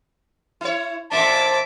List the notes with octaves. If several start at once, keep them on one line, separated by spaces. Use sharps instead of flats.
E4 C#5
F2 A#2 D4 E5 A5 D6